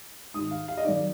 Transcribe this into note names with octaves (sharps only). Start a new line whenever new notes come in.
G#2 D#3 D#6
F5
F5
D#5
F#2 D#3 D5